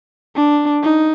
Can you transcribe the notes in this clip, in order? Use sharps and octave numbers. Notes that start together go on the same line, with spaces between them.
D4
D#4